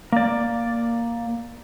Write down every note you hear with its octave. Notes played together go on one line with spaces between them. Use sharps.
A#3 D5